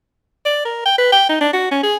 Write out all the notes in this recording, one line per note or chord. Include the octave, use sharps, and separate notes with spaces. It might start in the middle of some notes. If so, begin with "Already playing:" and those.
D5
A#4
G5
B4
G5
D#4
D4
F#4
C#4
G#4